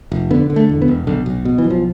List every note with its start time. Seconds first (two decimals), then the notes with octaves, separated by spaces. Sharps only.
0.12 F1
0.31 D3 B3
0.50 D3
0.56 A3
0.69 E1
0.82 B3
0.88 E1
1.07 B1 D3
1.26 B1
1.45 B2
1.58 E3
1.64 B1
1.70 F3